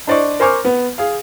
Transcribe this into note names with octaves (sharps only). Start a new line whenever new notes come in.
D4 C5 D5 D#5 C#6
A#4 C5 G#5 C#6 D6 F6
B3
G#4 F5